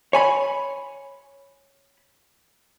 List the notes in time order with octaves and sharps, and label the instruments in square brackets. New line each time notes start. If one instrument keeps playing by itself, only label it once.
[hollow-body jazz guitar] C#5 G#5 B5